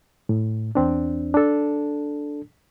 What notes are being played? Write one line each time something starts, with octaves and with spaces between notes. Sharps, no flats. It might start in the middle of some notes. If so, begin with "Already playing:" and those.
A2
E2 C4 D4
D4 A4